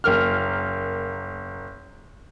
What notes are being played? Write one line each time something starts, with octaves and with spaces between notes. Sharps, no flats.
F#1 A#3 F6